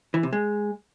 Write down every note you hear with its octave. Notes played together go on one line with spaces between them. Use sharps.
E3
C3
G#3